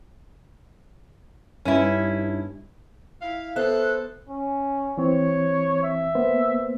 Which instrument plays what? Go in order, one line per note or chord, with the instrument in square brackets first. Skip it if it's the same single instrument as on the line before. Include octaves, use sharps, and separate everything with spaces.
[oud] G2 B3 D#4 [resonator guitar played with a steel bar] C#4 E4
[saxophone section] E4 F5
[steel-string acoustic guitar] B3 C5 E5 [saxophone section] A4 [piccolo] F#6
[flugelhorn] C#4
[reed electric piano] E3 C4 [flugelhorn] C#5
[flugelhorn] E5
[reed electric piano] A#3 B3 C5